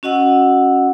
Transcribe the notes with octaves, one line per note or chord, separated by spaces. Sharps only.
C#4 F#4 D#5 F#5 E6